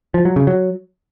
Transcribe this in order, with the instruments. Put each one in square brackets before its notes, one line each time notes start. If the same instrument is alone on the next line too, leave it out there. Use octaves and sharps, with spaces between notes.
[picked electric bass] F3
F#3
C#3
F#3